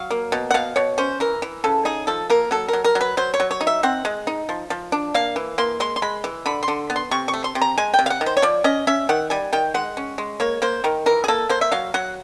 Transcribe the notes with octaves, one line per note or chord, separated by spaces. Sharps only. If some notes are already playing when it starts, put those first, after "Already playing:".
Already playing: F#3 F5
A#3
B2
F#5
B2 F5
B2 C#5
C#4 C5
E3 A#4
E3
C#3 A4
D#4 G#4
F3 A4
A#3 A#4
F#3 A4
F#3 A#4
A#4
F#3
B4
F#3 C5
C#5
F#3
C#5
D#4
E5
C4 F#5
G#3
D#4
F3
F3
D4
A#3 F5
E3
A#3 C6
G#3 C6
C6
G#3 B5
E3
D3 B5
C6
D3
B3
C6
C3 C#6
C#6
A3
C6
C3
A#5
G#3 G#5
G5
C3
F5
F#5
D#3
C5
C#5
F3 D5
C#4 D#5
C#4 E5
D#3 F#5
G3 G#5
D#3 G5
G#3 F#5
C#4
G#3
A#3 C#5
A#3 C5
D#3 A#4
E3 A#4
G#4
A#3 A4
A#3 C5
E5
F#3 F5
F#3 F#5